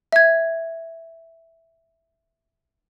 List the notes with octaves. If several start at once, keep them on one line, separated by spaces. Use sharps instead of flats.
E5 G#6